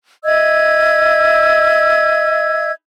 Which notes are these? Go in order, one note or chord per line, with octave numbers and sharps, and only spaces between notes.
D#5 E5 E6 G#6